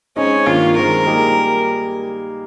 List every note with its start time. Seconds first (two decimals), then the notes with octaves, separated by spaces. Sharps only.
0.16 G#3 C4 C#4 D#4 G#4 D#5
0.46 G2 D#3 A#3 F4
0.76 D#3 G#3 C4 A#4
1.06 G3 A#3 D#4 G#4